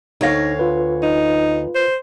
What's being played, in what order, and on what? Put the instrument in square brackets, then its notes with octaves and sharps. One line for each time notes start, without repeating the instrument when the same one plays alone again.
[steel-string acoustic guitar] D2 C#5 F5 [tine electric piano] D#4 A#6
[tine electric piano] F4 B4
[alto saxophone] D#4
C5